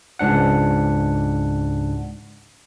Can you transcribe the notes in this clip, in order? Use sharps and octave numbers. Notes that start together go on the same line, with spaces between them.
C#2 G#2 D4 F#5